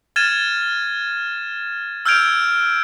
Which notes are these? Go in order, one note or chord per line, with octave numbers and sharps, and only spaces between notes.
F6 G#6 A6 D#7 E7
E6 F6 G6 G#6 D7 F7